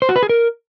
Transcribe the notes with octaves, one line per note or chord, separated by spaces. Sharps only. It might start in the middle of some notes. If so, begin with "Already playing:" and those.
C5
F#4
B4
G#4
A#4